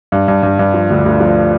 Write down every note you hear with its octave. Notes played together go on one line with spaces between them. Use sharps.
G2
G2
G2
G2
F3
D2
D2
F3